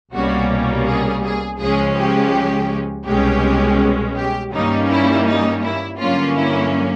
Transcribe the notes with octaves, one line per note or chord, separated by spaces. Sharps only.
C2 B2 G3 A#3 C#4 F#4
G#4
G#4
C#2 C#3 F3 G#3 C#4 G#4
G4
C2 B2 G#3 C#4 G4
G4
G2 D#3 G3 A#3 C#4 D#4
E4
D#4
E4
G2 D3 F#3 A#3 C#4 F4
E4